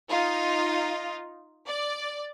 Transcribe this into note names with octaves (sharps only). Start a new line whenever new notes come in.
D#4 F4
D5